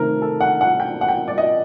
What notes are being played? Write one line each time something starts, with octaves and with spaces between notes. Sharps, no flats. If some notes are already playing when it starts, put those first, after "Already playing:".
Already playing: C3 D#3 A3 C4 A#4
A4
F#5
F#5
G5
F#5
G5
D5
D#5